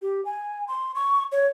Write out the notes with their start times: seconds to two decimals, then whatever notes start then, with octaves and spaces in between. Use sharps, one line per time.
0.02 G4
0.25 G#5
0.68 C6
0.95 C#6
1.32 C#5